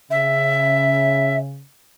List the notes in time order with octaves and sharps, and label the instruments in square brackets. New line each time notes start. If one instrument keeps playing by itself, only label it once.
[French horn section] C#3 [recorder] E5